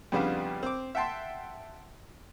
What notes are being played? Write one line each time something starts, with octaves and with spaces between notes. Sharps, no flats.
F2 C#3 G3 B3 D4 F4
C4 D6
E5 F#5 G5 A5 C6